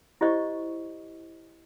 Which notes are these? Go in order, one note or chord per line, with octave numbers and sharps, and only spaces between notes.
E4 G4 C5 D5 D#5 C#6